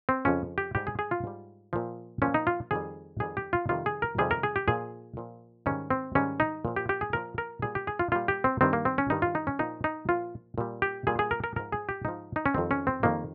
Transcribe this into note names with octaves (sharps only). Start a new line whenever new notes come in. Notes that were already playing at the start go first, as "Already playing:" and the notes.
C4
F2 C#3 F3 C#4
G4
G#2 G3 G4
G#4
G#4
F4
G#2 G3
A#2 F3
A#2 F3 C#4
D#4
F4
F2 D#3 G3 G#4
F2 D#3 G3 G#4
G4
F4
F2 C3 D#3 G3 F4
G#4
A#4
F2 C3 D#3 G3 G#4
A#4
G#4
G4
A#2 F3 G#4
A#2 F3
G#2 D#3 G3 C#4
C4
G#2 D#3 G3 C#4
D#4
A#2 F3
G4
G4
G#4
A#2 F3 A#4
A#4
A#2 G3 G#4
G4
G#4
F4
A#2 G3 F4
G4
C4
G2 D#3 G3 C4
A#3
C4
C#4
G2 D#3 G3 D#4
F4
D#4
C#4
A#2 F3 D#4
D#4
A#2 F3 F4
A#2 G3
G4
A#2 G3 G#4
G#4
A#4
A#4
G#2 F3 A#4
G#4
G4
G#2 F3 D#4
D#4
C#4
F2 D#3 G3 C4
C#4
C4
F2 D#3 G3 A#3